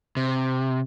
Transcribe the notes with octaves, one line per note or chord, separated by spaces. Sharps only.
C3